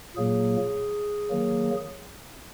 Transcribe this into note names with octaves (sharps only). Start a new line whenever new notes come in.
A#2 F#3 A#3 G#4
D#3 F#3 A#3